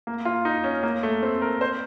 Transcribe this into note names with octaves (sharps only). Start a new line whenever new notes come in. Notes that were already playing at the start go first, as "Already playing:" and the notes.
A#3
F4
D#4
C#4
A#3
A3
C4
A#4
C5